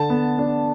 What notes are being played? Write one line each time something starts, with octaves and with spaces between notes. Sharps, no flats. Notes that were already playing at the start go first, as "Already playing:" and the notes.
Already playing: D3 A5
B3
D4